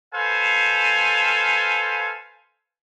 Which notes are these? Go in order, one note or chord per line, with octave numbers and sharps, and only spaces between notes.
A4 B4 C5 F5 G#5